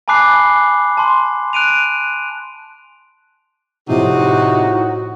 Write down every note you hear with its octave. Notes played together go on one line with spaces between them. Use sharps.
G#5 A5 B5 D6 F#6 C7
A5 C6
F#6 D7 D#7 F7
A2 C3 F3 D#4 F#4